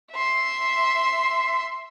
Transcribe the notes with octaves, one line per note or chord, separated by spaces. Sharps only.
E5 C6